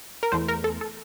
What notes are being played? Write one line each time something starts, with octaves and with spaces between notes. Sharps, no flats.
A#4
E2 E3 A3 C5
A#4
A4
A4